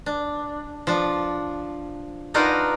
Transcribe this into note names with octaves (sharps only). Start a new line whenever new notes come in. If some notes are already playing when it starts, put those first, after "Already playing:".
D4
F3 D4
D4 D#4 F4 F#4 A#4 B4